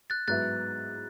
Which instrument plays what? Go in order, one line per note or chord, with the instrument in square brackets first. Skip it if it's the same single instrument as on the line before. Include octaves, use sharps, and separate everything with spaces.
[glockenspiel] F#6 A6
[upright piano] G#2 F#3 B3 E4 [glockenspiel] F#6 A6